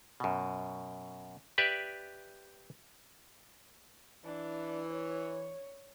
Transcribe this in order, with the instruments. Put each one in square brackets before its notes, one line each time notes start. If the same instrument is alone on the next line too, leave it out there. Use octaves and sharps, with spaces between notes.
[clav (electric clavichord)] F#2 B2
G4 B4 D5 E5
[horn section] E3 [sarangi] D4
[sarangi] C#5